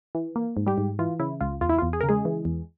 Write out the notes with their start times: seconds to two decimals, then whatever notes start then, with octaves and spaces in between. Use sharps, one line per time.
0.15 E3
0.36 A#3
0.57 G#2
0.67 G3 G4
0.78 G#2
0.99 E3 F4
1.20 C#3 E4
1.41 C#2 F4
1.61 E2 F4
1.69 E4
1.78 E2 F4
1.93 G#4
2.01 C#3 A#4
2.09 G#3 G#4
2.25 E3
2.45 E2